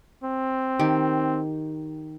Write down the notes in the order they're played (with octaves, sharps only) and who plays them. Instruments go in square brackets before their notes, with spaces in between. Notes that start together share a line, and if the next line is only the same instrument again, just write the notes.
[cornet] C4
[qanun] D#3 G4